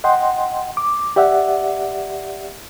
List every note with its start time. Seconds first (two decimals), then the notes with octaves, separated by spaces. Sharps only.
0.04 D#5 F#5 G5 C6
0.77 D6
1.16 G4 D5 E5 F#5